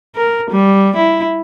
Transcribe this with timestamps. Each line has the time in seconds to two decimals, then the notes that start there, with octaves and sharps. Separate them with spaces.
0.16 A#4
0.51 G3
0.96 E4